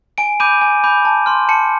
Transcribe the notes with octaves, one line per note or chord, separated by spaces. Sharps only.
G#5 D7
B5 D6 G6 D#7
G#5
B5 D6 G6
A5
C6 F6
A5 C#7